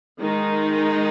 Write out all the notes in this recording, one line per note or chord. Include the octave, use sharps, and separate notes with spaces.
D#3 G#3 D#4